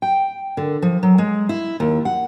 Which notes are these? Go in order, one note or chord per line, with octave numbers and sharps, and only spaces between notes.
G5
D3
F3
F#3
G#3
E4
D#2
F#5